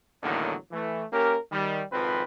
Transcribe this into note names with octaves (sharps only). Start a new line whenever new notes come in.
E2 A2 D3 D#3 F#3 A#3
E3 A3
A#3 C#4 G4 A#4
D#3 G3
G#1 F2 F3 C4 B4